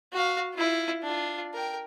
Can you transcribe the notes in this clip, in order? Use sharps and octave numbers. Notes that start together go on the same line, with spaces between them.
F#4 F5
E4 F4
D4 F4
A#4 G5